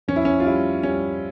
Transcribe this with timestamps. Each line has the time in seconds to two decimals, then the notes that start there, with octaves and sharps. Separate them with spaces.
0.08 F2 C#4
0.16 E4
0.25 C#4
0.40 F4
0.45 G3 E4
0.83 G3 C#4